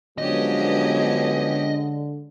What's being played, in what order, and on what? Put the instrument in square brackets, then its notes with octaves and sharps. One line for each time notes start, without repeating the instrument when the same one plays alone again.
[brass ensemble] D3 [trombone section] F3 F#3 B3 [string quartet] G#3 C#4 G4 [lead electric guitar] D#5